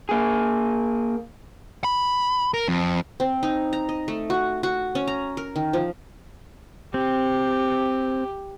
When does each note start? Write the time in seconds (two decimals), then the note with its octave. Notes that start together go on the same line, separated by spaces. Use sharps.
0.09 A#3 G#4
1.84 B5
2.54 A#4
2.68 F2
3.20 C4
3.43 D#4
3.73 A#5
3.89 D#5
4.08 A3
4.30 F#4
4.63 F#4
4.95 C#4
5.07 A#5
5.37 A#4
5.56 D#3
5.73 F3
6.94 C4 G4